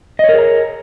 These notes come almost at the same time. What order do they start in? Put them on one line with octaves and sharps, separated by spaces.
D#5 C#5 A#4 G#4 A#5